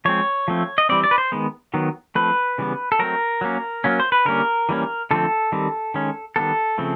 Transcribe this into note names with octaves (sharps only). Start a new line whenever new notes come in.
F3 G#3 C4 C#5
F3 A3 C4
D#5
E3 G3 C4 D5
D5
B4
C5
D#3 G#3 B3
D#3 F#3 B3
F3 A3 C4 B4
C#3 E3 G3 B3
A4
F#3 A3 C4 A#4
F#3 A#3 C#4
F#3 A#3 C#4
C5
B4
D3 G3 A#3 C#4 A#4
E3 G3 A#3 C#4
D3 F3 A3 C4 A4
D#3 G3 C4
D#3 G#3 C#4
D#3 G3 B3 A4
C#3 F3 A3 C4